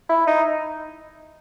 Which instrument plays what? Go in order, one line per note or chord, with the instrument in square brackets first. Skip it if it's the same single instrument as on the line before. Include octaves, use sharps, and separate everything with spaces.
[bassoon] E4
D#4